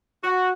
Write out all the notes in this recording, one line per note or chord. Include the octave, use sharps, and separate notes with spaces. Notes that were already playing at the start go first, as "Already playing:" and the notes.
F#4